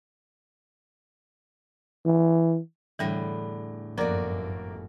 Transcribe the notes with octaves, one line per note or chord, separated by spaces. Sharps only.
E3
E2 A2 D3 E3 G3
G1 F#2 F3 A3 A#3 F#4 D5 D#5